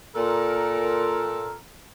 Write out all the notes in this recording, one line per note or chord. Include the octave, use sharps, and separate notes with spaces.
A#2 A4 A#4